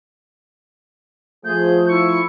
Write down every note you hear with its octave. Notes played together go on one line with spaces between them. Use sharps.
F3 A3 G#4 G6
E4 C#6